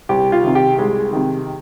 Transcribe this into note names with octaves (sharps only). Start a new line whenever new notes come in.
C2 G4
F4
C3 D#3
G4
C2 G#3
C3 D#3